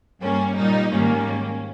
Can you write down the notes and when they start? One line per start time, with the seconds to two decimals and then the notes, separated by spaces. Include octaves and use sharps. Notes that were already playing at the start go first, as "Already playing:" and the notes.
0.22 G2 G3 A#3 C#4
0.57 A#2 G3 A#3 D#4
0.91 G#2 D#3 G3 A#3 C#4